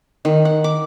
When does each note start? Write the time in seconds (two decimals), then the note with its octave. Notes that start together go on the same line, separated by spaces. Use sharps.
0.25 D#3
0.45 F#5
0.64 D6